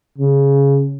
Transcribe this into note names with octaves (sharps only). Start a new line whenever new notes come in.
C#3